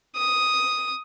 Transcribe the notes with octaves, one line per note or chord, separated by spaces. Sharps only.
D#6